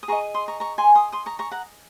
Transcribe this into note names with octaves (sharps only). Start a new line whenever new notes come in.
D#6
G#4 D#5 A#5 C#6
C6 D#6
A#5 C#6
A#5 C#6
G#5 C6
C6 D#6
C6 D#6
A#5 C#6
A#5 C#6
F#5 A#5